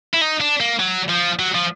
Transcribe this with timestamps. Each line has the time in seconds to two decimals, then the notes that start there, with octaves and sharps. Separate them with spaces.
0.14 E4
0.21 D#4
0.40 D4
0.60 A#3
0.80 F#3
1.10 F3
1.39 F#3
1.55 F3